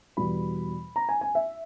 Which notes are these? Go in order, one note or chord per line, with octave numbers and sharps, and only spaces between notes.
E2 B2 G3 B5
A#5
G#5
G#5
E5